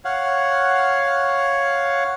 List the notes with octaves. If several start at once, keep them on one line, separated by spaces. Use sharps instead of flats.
C#5 F5 F#5